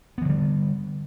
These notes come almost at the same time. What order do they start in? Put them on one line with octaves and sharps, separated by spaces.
B3 E3 D3 G3